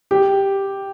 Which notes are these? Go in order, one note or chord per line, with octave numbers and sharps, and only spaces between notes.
G4